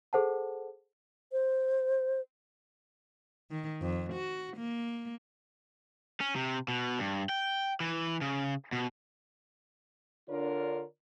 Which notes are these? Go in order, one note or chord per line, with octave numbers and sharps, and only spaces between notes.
G#4 A4 C5 F#5 A5
C5
D#3
F2
F#4
A#3
C#4
C3
B2
G2
G5
E3
C#3
B2
D3 D4 F4 A#4 C#5 D5